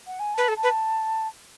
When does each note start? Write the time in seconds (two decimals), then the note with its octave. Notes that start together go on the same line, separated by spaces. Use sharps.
0.07 F#5
0.19 G#5
0.34 B4 A5
0.48 A4
0.56 A5
0.63 B4